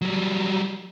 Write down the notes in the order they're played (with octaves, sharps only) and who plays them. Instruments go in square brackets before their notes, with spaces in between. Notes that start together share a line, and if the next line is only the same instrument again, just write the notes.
[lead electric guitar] F#3 G3